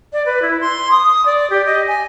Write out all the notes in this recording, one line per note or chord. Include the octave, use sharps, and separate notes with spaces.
D5
B4
E4
C6
D#6
D5
G4
D#5
G#5